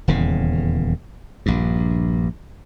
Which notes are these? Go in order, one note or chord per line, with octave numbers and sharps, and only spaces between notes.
D#1 E2 C#3
A#1 G2